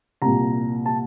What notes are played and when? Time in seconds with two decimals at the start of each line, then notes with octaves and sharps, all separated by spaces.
0.22 C2 A#2 A#5
0.85 A5